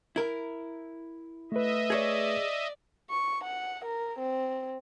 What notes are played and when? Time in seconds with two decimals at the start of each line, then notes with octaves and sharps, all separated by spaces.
0.16 E4 A#4
1.52 A3 B4 D#5 E5
1.90 G#4 C#5 D5
3.10 C#6
3.44 F#5
3.85 A#4
4.19 C4